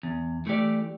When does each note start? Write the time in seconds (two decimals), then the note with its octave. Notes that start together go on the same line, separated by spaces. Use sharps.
0.03 E2
0.46 E3 A3 G4 D5